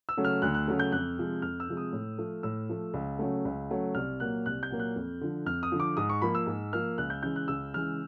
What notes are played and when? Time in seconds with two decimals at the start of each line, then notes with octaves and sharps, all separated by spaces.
0.09 E6
0.17 C#3 F#3 A3
0.25 F6
0.42 D2 F#6
0.54 F#6
0.68 C#3 F#3 A3
0.79 G6
0.92 F2 F#6
1.17 C3 F3 G#3
1.42 F2 F6
1.60 E6
1.68 C3 F3 G#3
1.77 D#6
1.93 A2
2.18 F3 A3
2.43 A2 E6
2.69 F3 A3
2.94 C#2
3.19 C#3 F#3 A3
3.45 C#2
3.71 C#3 F#3 A3
3.95 C2 F6
4.20 A#2 F#3 A#3 F#6
4.46 C2 F#6
4.63 G6
4.70 A#2 F#3 A#3
4.79 F#6
4.96 F2
5.21 D3 F3
5.46 F2 F6
5.63 D#6
5.72 D3 F3
5.80 D6
5.97 G#2 D#6
6.09 C#6
6.22 F3 A#3 B5
6.35 E6
6.47 G#2
6.73 F3 A#3 F6
6.98 C#2 F#6
7.10 G6
7.23 C#3 E3 G#3 G6
7.36 F#6
7.48 C#2 E6
7.74 C#3 E3 G#3 F6